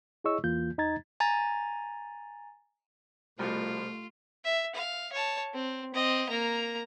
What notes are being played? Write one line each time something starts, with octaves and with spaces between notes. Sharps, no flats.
E4 G#4 C#5 D#5 C#6 E6
E2 E3 A#3 F4 G6
E2 D#4 D#5 A#5 G#6 A6
G#5 A#5 A6
C2 B2 F3 A3 F4
E5
F5
C#5 A5
C4
C4 D#5
A#3 A#5